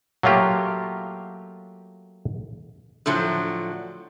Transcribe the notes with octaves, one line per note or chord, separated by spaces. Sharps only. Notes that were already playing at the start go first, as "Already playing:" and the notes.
F#3 A3 A#3 F4 G4
A2 D3 F3 F#3